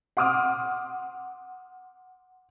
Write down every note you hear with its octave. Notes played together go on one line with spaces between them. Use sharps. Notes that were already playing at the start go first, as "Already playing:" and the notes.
F#5 C6 D6 D#6 F6